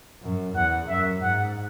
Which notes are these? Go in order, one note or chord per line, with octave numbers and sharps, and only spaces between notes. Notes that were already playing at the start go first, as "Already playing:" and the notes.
F#2
E2 F#5
F#2 E5
G#2 F#5